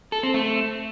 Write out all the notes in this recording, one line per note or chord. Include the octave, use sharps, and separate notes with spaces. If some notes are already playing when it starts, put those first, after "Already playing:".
A4
C4
A3